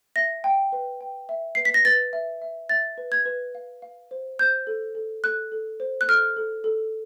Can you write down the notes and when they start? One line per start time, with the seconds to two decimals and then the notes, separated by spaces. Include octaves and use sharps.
0.16 E5 A#6
0.44 G5
0.72 B4
1.01 G5
1.29 E5
1.55 B4 C7
1.65 B6
1.74 A#6
1.85 B4 A6
2.13 E5
2.42 E5
2.69 E5 A6
2.98 B4
3.12 G#6
3.25 B4
3.55 F5
3.82 F5
4.11 C5
4.39 C5 G6
4.67 A4
4.95 A4
5.24 A4 F#6
5.52 A4
5.80 C5
6.01 F#6
6.08 A4 F6
6.36 A4
6.64 A4